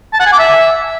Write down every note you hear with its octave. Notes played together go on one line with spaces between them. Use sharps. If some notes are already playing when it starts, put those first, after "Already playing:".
A5
F#5
G#5
D6
E5